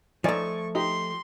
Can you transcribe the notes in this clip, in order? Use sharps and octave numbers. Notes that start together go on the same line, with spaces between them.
F3 A3 D#4 D5 G#5 C#6
D#4 G4 C6